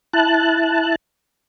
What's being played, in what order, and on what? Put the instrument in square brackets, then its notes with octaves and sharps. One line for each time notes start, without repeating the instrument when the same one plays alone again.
[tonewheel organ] E4 A5 F#6